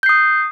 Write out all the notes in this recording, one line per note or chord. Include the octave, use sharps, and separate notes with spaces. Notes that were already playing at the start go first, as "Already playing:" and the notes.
D#6 G6 C7